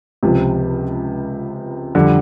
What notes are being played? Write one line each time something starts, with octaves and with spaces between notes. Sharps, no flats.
C#2 C3 F3
F2 D3 G3